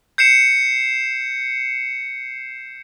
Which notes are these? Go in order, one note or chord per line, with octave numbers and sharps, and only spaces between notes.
G6 C7 C#7 E7